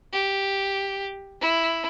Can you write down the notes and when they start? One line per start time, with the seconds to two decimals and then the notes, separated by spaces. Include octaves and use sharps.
0.12 G4
1.40 E4